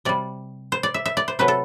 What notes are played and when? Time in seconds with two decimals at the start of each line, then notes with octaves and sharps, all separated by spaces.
0.05 C3 G3 D5
0.72 C5
0.83 D5
0.94 E5
1.05 E5
1.17 D5
1.28 C5
1.39 C3 F#3 A3 B4
1.48 A4